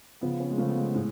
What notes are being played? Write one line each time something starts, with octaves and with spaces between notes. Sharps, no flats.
C#3 F3 B3
C#4
G#3
C#3 F3 A3
B3
G#3
B3
A2 G#3